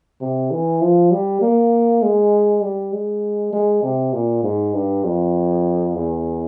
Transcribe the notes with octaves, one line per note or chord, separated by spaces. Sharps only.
C3
E3
F3
G3
A#3
G#3
G3
G#3
G#3
C3
A#2
G#2
G2
F2
E2